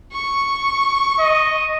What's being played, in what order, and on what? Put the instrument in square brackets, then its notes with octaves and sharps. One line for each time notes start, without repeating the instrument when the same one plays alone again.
[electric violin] C#6
[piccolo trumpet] D#5